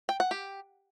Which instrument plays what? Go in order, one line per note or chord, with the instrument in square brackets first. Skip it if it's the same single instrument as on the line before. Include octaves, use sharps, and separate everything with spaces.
[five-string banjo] G5
F#5
G4